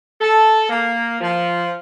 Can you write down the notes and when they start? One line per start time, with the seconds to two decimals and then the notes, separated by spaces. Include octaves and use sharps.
0.21 A4
0.69 A#3
1.21 F3